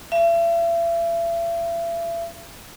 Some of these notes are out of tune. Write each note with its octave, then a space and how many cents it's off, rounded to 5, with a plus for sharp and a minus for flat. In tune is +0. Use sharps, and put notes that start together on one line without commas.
E5 +40